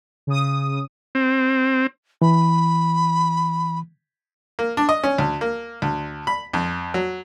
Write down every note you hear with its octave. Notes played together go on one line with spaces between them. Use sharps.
C#3 D#6
C4
E3 B5
A#3
D4
D#5
C#4
D2
A#3
D2
B5
F2
F#3